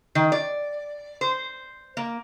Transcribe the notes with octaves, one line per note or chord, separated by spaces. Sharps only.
D#3
D5
C5
A#3